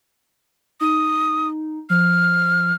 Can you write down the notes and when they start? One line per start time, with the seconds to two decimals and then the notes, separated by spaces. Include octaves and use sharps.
0.81 D#4 D#6
1.90 F3 F6